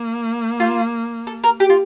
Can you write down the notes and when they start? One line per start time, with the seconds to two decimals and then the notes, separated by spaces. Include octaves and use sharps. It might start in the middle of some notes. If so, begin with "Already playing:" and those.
Already playing: A#3
0.60 F4
1.27 A4
1.44 A#4
1.60 G4
1.70 F4